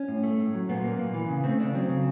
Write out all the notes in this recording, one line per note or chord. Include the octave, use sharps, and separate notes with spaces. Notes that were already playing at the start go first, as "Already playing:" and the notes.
Already playing: C#4
A2
A3
A2
F#3
A#2 B3
A#3
A#2
E3
C#3
A3 C4
C#3 D4
F#3 C4
C#3